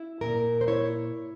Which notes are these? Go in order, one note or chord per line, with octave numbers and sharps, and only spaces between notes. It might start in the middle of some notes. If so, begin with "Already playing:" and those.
Already playing: E4
A#2 A#4
C5
E4 C#5